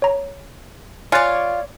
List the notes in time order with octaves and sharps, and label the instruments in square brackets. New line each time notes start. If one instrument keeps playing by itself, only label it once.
[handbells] C#5 A#5
[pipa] F4 [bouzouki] C#5 D5 [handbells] G#5 F#6 A6